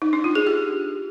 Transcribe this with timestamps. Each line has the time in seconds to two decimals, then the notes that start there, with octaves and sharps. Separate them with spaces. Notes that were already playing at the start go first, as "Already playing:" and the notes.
0.02 D#4
0.13 D4
0.24 F4
0.35 G#4
0.47 G4